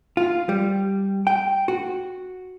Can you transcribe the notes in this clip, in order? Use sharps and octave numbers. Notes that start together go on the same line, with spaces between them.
F4
G3
G5
F#4